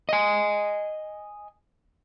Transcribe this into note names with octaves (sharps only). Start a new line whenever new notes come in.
D#5 G#5